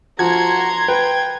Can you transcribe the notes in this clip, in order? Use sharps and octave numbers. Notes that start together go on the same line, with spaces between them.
F3 F#4 A#5 C6 G#6
B4 G5